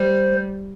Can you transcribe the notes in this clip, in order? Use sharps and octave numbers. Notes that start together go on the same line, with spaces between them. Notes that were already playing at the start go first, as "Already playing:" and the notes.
Already playing: G3 C5